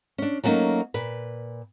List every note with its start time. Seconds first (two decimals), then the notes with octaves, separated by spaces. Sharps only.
0.18 C#4 D4
0.44 F#3 G3 A3 A#3 C#4 D#4
0.94 A#2 B4